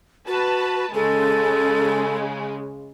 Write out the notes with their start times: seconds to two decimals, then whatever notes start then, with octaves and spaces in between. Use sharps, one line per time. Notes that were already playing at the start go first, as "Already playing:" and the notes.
0.27 F#4 B4 A5
0.94 C#3 G#3 A4